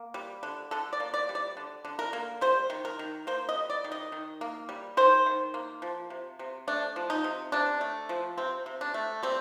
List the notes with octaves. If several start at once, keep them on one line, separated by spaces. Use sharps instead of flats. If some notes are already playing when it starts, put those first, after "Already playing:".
Already playing: A#3
G3
D3
D3 A4
D5
A#3
D5
G3
D5
D3
D3
A#4
A#3
G3 C5
D#3
A#4
D#3
A#3 C5
D#5
G3
D5
D#3
D#5
D#3
A#3
G3
D#3 C5
D#3
A#3
F3
C3
C3
A3 D4
F3
D#4
C3
C3 D4
A3
F3
C3 C4
C3
D4
A3
G3 C4